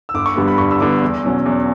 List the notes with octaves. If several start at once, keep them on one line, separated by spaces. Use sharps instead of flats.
E6
G1 D6
C#6
G2 D3 G3 B3
B5
G1 C#6
E6
G2 D3 G3 B3 D6
E2
B2 F#3 C#4
E2